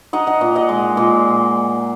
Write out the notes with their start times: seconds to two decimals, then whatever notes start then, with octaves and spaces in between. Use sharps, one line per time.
0.13 D#4 D#5 F#5
0.27 D#5 F#5
0.41 A#2
0.56 D#5 F#5
0.69 G#3
0.97 A#2